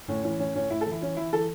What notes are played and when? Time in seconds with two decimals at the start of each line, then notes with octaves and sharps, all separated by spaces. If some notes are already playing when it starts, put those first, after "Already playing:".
0.08 A2 C#4
0.23 E3 C#4
0.39 A2 C#4
0.55 A2 C#4
0.70 A2 E4
0.81 A4
0.86 E3
0.92 E4
1.01 E3 C#4
1.17 E3 E4
1.33 E3 A4